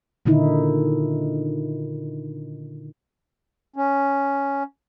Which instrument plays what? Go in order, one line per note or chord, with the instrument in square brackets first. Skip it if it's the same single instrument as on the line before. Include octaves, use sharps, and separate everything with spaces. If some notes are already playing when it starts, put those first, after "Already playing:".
[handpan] A#2 D3 D#3 D#4 E4
[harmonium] C#4